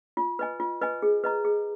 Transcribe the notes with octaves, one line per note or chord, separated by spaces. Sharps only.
F4
B4 D#5 G#5
F4
B4 D#5 G#5
G#4
B4 D#5 A#5
G#4